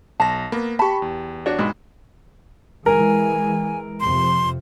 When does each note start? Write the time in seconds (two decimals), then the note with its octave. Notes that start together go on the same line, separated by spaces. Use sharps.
0.20 B1 A5 A#6
0.52 A#3 B3
0.79 G4 A5 B5 C#6
1.02 E2
1.46 D4 F#4 C#5
1.59 B1 G#2
2.86 E3 G#3 A#4 G#5
4.00 F2 C3 C6